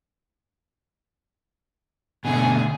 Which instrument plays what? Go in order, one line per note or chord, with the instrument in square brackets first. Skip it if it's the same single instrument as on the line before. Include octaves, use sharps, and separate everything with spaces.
[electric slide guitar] B2 D3 A3 [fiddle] G#4